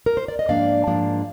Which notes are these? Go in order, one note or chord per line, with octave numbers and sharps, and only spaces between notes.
A#4
C5
D5
D#5
G#2 F3 A#3 D4 D5 F5
G#2 F3 A#3 D4